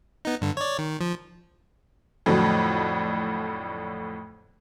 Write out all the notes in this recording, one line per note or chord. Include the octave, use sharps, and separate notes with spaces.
B3 D#4
G2 D3
C#5 D5
D#3
F3
F2 A2 D3 F#3